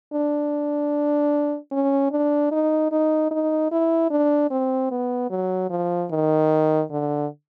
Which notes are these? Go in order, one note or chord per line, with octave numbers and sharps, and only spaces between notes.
D4
C#4
D4
D#4
D#4
D#4
E4
D4
C4
B3
F#3
F3
D#3
D3